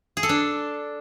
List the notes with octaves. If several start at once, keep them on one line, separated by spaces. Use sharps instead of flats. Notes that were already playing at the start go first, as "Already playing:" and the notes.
G#4
A4
D4